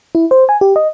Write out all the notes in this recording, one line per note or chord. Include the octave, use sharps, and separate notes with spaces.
E4
C5
G#5
G4
D#5